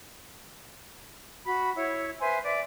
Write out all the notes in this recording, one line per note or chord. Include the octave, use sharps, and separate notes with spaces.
F#4 B5
E4 C#5
B4 C5 E5 G#5
D5 E5